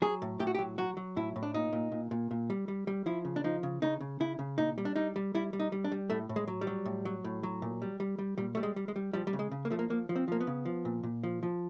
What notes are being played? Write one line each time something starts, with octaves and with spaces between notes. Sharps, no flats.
F#3 G#4
A2
A2 G4
F#4
G4
F#3
F#3 F#4
F#3
A2 E4
A2
D4
A#2 D#4
A#2
A#2
A#2
A#2
G3
G3
G3
F3 E4
C#3
D4
F3 D#4
C#3
C#3 D#4
C#3
C#3 E4
C#3
A#2 D#4
G3
D4
G3 D#4
G3
G3 E4
G3
D#4
G3
D4
G3
A2 A3
A2
G#3
F#3
G3
F#3
A2
F#3
A2
F#3
A#2
G3
G3
G3
A#2 G3
G3 A3
G#3
G3
G#3
G3
F3 G3
G3
C#3
G#3
C#3
A#3
F3 A3
A#3
F3 A#3
F3
C4
F3 A#3
B3
C#3
F3
A#2
A#2
F3
F3